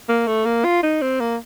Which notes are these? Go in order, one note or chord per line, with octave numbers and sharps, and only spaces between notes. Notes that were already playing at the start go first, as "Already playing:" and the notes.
A#3
A3
A#3
F4
D#4
C4
A#3